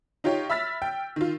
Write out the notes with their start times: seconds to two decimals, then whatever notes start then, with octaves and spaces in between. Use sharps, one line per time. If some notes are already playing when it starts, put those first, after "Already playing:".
0.24 D#4 F4 G4 C#5
0.50 E5 B5 E6 F6 A6 B6
0.82 G5
1.16 D#3 F4